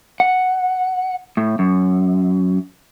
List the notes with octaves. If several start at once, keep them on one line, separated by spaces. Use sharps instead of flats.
F#5
A2
F#2